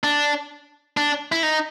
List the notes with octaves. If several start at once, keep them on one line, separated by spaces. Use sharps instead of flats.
D4
D4
E4
D#4